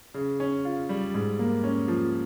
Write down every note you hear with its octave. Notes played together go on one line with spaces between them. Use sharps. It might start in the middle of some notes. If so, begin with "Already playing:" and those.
C#3
C#4
F4
G3
G#2
A#3
C#4
F3